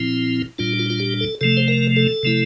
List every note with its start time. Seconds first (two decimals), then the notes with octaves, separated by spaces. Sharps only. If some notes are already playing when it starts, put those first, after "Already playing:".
Already playing: A#2 F3 C4 E4
0.58 A#2 G3 D4 F4
0.79 F4
0.90 F4
1.00 G4
1.20 A4
1.41 C3 F3 A3 A4
1.57 C5
1.68 A#4
1.96 A4
2.23 C3 F3 A3 E4